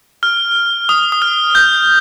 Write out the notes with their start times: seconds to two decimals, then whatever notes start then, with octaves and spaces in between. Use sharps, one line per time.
0.23 F6
0.89 D#6
1.12 D#6
1.22 F6
1.55 G6